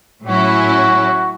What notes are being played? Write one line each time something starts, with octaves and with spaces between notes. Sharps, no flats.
A2 F#3 C#4 E4 F#4